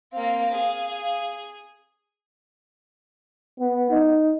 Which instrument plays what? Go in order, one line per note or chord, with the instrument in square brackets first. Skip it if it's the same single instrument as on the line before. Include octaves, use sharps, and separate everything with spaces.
[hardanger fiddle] A#3 C4 [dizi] F5
[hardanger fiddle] G#4
[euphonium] B3
D#4